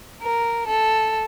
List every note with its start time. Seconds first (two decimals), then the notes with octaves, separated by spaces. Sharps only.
0.22 A#4
0.67 A4